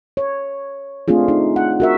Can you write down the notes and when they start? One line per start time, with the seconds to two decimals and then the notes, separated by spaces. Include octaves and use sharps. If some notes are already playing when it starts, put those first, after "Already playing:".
0.17 C#5
1.08 A3 C4 D4 F4 G#4
1.28 D#4
1.56 F#5
1.80 F#4 A#4 E5